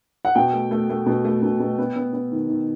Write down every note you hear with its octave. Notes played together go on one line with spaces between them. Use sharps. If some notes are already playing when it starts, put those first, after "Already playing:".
F#5
B2 G5
A3
A3
A3
B2
A3
B2
B2
B3
B3
B3
D#3
D#3